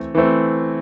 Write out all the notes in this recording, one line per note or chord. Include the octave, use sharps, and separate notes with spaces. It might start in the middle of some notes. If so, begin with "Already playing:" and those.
Already playing: E3 A3 C4
E3 A3 C4